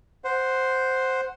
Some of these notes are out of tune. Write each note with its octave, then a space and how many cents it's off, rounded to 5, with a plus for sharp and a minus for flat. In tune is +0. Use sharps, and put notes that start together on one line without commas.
C5 +0 F#5 +0